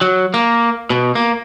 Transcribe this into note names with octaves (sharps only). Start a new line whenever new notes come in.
F#3
A#3
B2
A#3